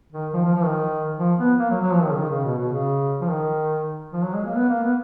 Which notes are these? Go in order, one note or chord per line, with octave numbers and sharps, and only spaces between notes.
D#3
F3
F3
F3
D#3
F3
B3
A#3
F#3
F#3
F3
D#3
C#3
D#3
C#3
B2
B2
C#3
F3
D#3
F3
F#3
G#3
A#3
B3
A#3
B3